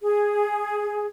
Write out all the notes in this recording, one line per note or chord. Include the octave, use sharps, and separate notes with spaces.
G#4